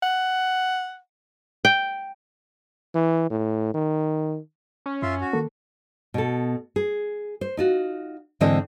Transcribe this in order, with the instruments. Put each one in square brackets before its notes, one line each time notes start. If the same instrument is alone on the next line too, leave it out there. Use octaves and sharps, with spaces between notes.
[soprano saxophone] F#5
[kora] G5
[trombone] E3
A2
D#3
[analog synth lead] C#4
[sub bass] F#2 [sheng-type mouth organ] F4 E5 C6
[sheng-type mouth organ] F#4
[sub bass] D#3 [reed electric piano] A#3 A4
[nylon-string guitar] B2 A4
G#4
C5
D#4 F4 F#4
G#2 D3 E3 C4 D#5